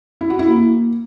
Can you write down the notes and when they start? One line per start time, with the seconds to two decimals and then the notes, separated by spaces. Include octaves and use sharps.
0.21 E4
0.30 F#4
0.39 E4
0.48 A#3